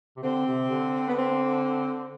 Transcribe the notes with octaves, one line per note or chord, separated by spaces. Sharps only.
C3
D3 C4
C3
D3
B3
C4